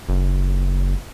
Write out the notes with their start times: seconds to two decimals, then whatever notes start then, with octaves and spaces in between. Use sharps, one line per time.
0.09 F#1